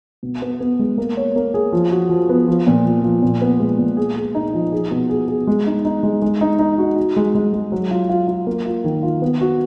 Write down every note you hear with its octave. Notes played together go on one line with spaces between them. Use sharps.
B2
B3
B3
G#3
A#3
C#5
A#3
G#4
F3
F#4
F3
B3
F3
A#2
F3
F3
A#2
B3
G#3
A#2
G#4
G#4
D#4
F3
G#4
B2
G#4
G#4
G#3
D#4
D#4
G#3
G#3
D#4
D#4
F#4
F#4
G#3
G#3
G#3
F#3
F4
F4
F4
A#3
F4
D#3
F4
B3
F#4